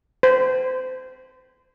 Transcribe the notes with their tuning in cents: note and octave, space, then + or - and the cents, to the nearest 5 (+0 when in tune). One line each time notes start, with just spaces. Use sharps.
C5 -30